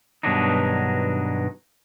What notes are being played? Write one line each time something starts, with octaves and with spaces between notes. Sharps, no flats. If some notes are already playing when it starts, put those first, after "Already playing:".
G2 B2 D#3 F#3 D4 D#4